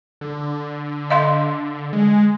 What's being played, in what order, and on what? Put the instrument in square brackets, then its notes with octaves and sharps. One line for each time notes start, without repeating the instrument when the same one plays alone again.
[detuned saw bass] D3
[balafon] D#5 F5 C6
[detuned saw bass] G#3